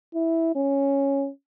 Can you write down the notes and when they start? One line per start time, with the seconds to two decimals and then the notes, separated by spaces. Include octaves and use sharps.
0.14 E4
0.55 C#4